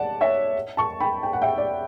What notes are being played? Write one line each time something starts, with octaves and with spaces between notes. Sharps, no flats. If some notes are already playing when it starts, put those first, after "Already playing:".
Already playing: D5 F#5 A5
C#5 E5
A5 C#6
G5 B5
G5
F#5
E5 G5
D5